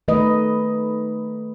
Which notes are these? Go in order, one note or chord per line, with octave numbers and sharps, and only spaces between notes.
D#3 A3 B4 D#5